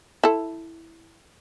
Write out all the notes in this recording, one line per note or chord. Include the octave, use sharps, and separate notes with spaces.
E4 A4